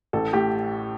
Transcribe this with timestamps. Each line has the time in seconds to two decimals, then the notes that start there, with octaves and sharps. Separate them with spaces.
0.13 A1 A4
0.33 A2 G4